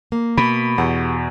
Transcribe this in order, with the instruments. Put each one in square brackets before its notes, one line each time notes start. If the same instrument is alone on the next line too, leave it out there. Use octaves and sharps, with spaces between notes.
[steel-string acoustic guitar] A#3
[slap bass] B2 [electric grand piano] B5
[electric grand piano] E2 [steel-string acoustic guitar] G4 F#5